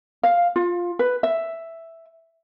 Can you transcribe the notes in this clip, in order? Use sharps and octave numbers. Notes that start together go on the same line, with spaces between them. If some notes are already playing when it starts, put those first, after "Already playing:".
F5
F4
B4
E5